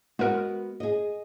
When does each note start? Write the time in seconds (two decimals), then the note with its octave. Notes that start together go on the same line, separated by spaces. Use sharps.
0.19 G#3 B3 F#4 A#4
0.80 G#4 D#5